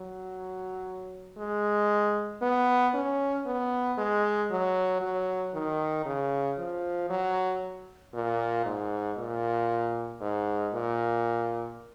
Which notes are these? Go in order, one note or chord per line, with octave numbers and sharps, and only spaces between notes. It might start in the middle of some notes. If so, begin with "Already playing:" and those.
Already playing: F#3
G#3
B3
C#4
B3
G#3
F#3
F#3
D#3
C#3
F3
F#3
A#2
G#2
A#2
G#2
A#2